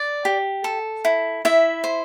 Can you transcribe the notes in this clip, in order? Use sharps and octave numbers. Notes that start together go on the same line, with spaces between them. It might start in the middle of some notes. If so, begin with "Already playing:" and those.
Already playing: D5
G4
A4
E4
E4 E5
C5